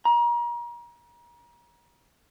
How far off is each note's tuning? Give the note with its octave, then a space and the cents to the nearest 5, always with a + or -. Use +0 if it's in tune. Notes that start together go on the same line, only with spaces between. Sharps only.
A#5 +35